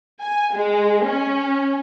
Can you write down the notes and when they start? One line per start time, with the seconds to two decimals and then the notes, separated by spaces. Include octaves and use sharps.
0.21 G#5
0.54 G#3
1.05 C#4